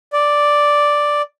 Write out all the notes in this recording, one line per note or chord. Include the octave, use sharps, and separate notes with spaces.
D5